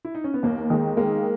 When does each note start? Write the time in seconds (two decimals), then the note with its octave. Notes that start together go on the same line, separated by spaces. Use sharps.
0.05 E4
0.15 D#4
0.24 C#4
0.34 B3
0.43 D#2 A#3
0.70 D#3 G#3
0.97 G#3 A#3